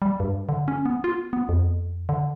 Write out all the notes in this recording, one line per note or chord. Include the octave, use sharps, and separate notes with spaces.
G3
G2
D3
C#4
B3
F4
B3
F2
D3